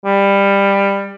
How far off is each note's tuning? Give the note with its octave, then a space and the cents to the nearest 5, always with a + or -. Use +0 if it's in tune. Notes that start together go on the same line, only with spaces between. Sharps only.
G3 +20